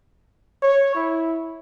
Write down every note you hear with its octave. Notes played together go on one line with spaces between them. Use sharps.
C#5
E4